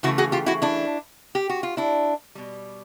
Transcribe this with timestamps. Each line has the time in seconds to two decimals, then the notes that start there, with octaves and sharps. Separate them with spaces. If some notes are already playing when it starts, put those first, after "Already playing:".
0.03 C#3 E3 A3 E4 F#4
0.18 F#4 G#4
0.32 F4 G4
0.46 E4 F#4
0.62 D4 E4
1.35 G4
1.49 F#4
1.63 F4
1.77 D4 E4
2.35 B2 G3